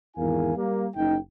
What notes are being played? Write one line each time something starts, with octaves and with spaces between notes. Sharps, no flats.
G#1 E2 E4 A#4 F5 G#5
G3 A#3
F#1 D#4 G5